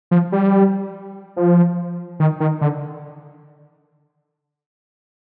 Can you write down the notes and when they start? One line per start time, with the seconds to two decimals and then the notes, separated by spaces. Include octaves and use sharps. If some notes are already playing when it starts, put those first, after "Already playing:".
0.11 F3
0.32 G3
1.36 F3
2.20 D#3
2.40 D#3
2.61 D3